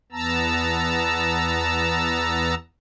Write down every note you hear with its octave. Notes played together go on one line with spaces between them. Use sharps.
E2 B3 A5 A#5 E6